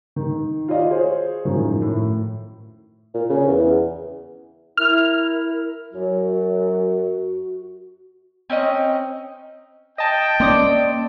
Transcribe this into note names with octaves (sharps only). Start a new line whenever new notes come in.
D#3
F4 D5 D#5 F5
G#4 C5 C#5
F#2 A2 D#3 F3
A2
A#2
C#3
E2
E4 A#4 F6
F#2 F#3 F#4
C4 C#4 D#4 D#5
D#5 G5 A5
A#3 C4 C#4 D5 D#6